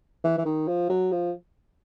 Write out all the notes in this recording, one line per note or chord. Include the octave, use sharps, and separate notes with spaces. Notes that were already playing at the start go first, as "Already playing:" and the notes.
E3
E3
D#3
F3
F#3
F3